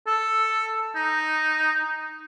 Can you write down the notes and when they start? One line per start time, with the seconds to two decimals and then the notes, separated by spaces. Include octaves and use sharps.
0.07 A4
0.95 D#4